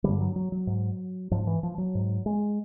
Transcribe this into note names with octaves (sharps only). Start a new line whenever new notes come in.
G2 D3 G3
F#3
F#3
F#3
G#2
G#2 F3
E3
F3
F#3
G#2
G#3